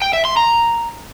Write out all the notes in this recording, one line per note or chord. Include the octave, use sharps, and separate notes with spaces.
G5
E5
C6
A#5